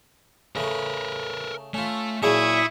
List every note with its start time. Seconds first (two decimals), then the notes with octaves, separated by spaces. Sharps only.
0.56 C#3 A3 A#4 B4
1.74 A3 C#4 F4
2.23 A#2 F#3 E4 G#4 E5 A5 C#6 D#6